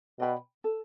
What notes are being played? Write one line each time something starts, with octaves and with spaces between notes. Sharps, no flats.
B2 D5 G5 B5
A4